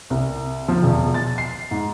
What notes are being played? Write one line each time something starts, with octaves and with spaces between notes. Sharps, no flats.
C2
F3
E1
A6
C7
G#2